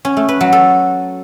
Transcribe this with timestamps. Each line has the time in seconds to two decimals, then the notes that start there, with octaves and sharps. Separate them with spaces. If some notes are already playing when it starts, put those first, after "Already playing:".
0.05 C#4
0.17 A3
0.29 B4
0.41 F#3
0.53 A4